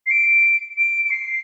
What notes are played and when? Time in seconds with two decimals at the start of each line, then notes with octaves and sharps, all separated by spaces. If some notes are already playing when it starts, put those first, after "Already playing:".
0.06 C7
0.10 D7
0.77 D7
1.05 D7
1.11 C7